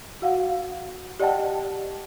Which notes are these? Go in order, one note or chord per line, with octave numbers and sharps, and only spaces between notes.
F#4 F5 F#5
G4 D5 D#5 F#5 G5 A5